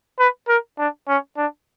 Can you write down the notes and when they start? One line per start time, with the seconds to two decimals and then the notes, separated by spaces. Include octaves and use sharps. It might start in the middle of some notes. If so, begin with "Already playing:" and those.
0.19 B4
0.48 A#4
0.79 D4
1.08 C#4
1.37 D4